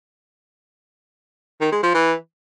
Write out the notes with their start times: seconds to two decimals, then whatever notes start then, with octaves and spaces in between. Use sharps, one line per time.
1.61 D#3
1.72 G#3
1.83 F3
1.94 E3